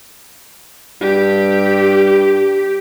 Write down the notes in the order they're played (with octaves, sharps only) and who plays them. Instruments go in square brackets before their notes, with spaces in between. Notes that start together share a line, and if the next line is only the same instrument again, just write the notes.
[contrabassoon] G2 [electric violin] G4